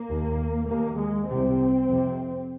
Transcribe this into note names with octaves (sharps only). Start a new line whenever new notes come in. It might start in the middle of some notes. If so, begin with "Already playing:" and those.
Already playing: A#3
D#2
D#2 A#3
G#3
C2 C3 C4
F2 C3